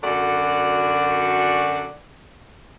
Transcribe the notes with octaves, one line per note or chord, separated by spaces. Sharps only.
F#2 D3 F#4 A4 D5